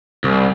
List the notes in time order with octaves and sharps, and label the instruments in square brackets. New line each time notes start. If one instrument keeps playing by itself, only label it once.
[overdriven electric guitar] C2